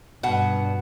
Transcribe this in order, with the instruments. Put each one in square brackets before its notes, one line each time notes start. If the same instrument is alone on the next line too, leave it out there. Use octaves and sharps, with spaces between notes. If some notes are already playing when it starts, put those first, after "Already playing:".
[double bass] G2 [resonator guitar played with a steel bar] B2 F#5